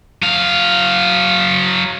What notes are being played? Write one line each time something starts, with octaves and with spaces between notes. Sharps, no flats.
F#3 F5